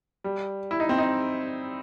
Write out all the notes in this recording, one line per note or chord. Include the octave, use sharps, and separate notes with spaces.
G3
E4
D#4
C4
D#4